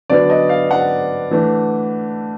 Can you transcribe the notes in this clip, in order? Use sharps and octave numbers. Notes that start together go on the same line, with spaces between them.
D3 F#3 B3 D4 D5
D#5
F5
F#5
E3 A3 D4